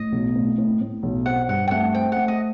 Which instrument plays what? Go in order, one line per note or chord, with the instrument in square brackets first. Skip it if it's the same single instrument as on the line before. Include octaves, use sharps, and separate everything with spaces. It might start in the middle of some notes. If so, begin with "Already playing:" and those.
Already playing: [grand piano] A2 [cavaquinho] D#5
[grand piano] B1
A2
A2
A2
B1
[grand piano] C4 [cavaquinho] F#5
[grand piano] G2 [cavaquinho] F#5
[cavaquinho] G5
[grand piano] A3 [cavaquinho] F#5
[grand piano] C4 [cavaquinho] G5
[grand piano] A3 [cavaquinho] F#5
[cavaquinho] D#5